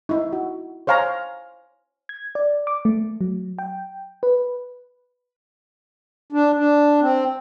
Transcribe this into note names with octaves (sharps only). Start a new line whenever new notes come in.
D#4 E4
F#4
C5 C#5 F5 G#5 A#5
G#6
D5
D6
A3
F#3
G5
B4
D4
D4
C4